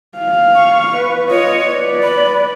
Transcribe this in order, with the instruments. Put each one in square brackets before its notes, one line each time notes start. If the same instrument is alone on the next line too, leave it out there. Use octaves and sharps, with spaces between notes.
[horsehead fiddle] F5
[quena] C#6
[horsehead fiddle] B4
[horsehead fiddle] F4 D#5 [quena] C#5
[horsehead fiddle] B4 D5
[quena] B5